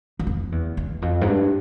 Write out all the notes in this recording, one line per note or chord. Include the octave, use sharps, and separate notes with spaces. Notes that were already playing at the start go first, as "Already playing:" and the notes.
E2
F2
E2
E2
F2
G#2
G2